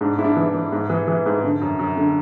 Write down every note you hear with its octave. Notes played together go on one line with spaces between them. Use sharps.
G#2 D4
G#2 E4
D4
E3
E4
E3
G#2
E3
E3
G#2
D3
F#2
F#2
D3